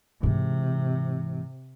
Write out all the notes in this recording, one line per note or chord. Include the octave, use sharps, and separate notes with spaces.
G#2 C3 E3